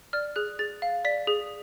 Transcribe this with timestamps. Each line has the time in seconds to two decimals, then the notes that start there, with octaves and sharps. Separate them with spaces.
0.13 D5 F6
0.36 G#4 F#6
0.59 G#4 A6
0.82 F5
1.05 D5 B6
1.27 G#4